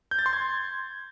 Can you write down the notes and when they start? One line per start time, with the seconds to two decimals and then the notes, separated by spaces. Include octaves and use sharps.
0.11 G6
0.19 A6
0.26 C6
0.33 G#6